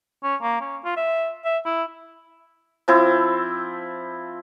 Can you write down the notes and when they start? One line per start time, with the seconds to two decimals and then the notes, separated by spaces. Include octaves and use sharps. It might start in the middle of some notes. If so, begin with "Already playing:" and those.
0.23 C#4
0.42 A#3
0.61 C#4
0.85 F4
0.97 E5
1.45 E5
1.65 E4
2.88 F3 C4 E4